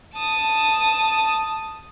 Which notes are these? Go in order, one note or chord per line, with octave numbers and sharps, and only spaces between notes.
A5 D#6